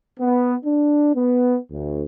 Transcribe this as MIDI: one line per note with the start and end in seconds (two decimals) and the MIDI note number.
0.19 0.55 59
0.65 1.13 62
1.15 1.58 59
1.71 2.03 38